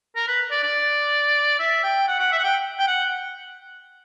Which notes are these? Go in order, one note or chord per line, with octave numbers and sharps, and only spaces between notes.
A#4
B4
D5
D5
E5
G5
F#5
F#5
E5
F#5
G5
G5
F#5